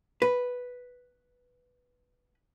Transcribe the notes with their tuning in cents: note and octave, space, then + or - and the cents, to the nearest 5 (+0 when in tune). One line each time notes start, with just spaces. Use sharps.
B4 +0